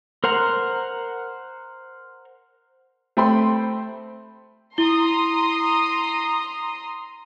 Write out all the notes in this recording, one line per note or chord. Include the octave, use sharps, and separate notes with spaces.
A#4 C5 F#5 A#5
A3 C4 G5 B5 C6
E4 A#5 C6 D#6 G7